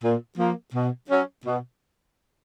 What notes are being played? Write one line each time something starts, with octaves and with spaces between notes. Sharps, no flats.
A#2
F3 A#3
B2
F#3 C#4
B2